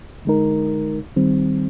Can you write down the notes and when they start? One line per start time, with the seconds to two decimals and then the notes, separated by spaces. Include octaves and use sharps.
0.25 D3 G#3 D#4 A#4
1.16 D#3 G3 C4